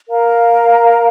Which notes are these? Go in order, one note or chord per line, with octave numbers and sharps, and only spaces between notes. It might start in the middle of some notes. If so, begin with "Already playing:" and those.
A#4 F5 A#5